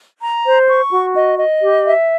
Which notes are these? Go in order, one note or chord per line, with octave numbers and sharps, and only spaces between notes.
A#5
C5
C#6
F#4
D#5
D#5
G4
E5